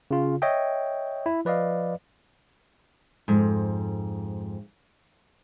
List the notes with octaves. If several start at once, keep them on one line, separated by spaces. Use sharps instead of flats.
C#3 F4
C#5 D#5 E5 G5
E4
F3 B4 D5 D#5 F5
F2 G#2